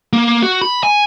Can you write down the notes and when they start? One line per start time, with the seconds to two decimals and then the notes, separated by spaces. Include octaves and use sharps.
0.13 A#3
0.43 F#4
0.61 B5
0.83 G#5